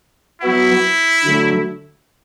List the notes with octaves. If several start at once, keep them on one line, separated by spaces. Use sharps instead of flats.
F#3 B3 E4 F#4
D3 F#3 A3